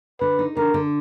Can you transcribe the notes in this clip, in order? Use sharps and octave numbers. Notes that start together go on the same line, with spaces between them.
D3 B4
D#4
D3 A#4
D3